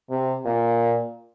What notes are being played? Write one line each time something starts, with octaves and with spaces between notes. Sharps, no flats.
C3
A#2